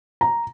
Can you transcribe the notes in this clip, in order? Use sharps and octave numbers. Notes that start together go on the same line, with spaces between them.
A#5